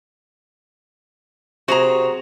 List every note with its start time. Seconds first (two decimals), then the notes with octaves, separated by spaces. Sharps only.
1.68 C3 F#4 G#4 A#5